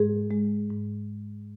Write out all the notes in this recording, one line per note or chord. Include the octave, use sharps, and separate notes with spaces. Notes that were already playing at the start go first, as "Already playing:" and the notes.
Already playing: G#2 G#3 G#4
G#3
G#2